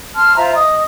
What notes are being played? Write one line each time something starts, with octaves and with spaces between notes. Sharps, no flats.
A5 C6 F6
F4 C5 E5 A#5
D#5 D#6